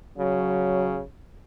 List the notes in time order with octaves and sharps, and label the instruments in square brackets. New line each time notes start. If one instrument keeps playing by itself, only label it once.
[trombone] C#3 [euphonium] F#3